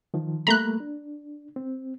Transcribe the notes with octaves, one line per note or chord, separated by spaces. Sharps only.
D#3 F3
G3 A3 A#3 A#5 B5 F#6
D4
C4